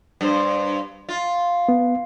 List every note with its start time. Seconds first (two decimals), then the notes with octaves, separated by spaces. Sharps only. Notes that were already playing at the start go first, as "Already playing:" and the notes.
0.21 G2 C5
1.09 F4
1.69 B3